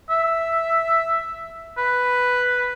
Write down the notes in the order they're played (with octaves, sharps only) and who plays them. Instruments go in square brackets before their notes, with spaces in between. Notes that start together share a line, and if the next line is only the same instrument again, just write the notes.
[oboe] E5
B4